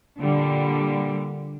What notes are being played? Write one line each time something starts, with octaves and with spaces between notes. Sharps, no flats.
A#2 D3 G3